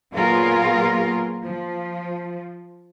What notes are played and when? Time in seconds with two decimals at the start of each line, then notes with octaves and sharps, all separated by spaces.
0.13 A#2 F#3 B3 F4 G#4 A#4
1.43 F3